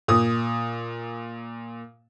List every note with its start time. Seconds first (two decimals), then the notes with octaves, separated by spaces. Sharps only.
0.08 A#2 D#6